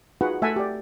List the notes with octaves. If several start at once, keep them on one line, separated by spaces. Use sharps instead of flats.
D#4 F4 F#4 G#4 B4 F#5
A3 E5 F#5 G#5 A5
G4 D5